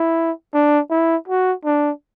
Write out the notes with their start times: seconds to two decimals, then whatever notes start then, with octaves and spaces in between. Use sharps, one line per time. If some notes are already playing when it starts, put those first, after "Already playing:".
Already playing: E4
0.54 D4
0.90 E4
1.28 F#4
1.65 D4